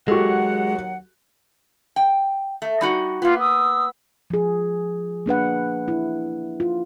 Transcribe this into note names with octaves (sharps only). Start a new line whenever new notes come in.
D#2 F#3 G#3 F#4 G4 A4 F#5
G5
A3
G3 D#4 F#4
A#3 B3 F4
D#6 E6
F3 G#4
A#3 D4 B4 F#5
E4
F4